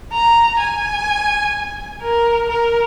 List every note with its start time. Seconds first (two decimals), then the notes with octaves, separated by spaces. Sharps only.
0.12 A#5
0.60 G#5
2.02 A#4
2.49 A#4